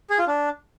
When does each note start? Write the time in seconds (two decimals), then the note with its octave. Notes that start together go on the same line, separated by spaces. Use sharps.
0.10 G#4
0.19 F4
0.27 D4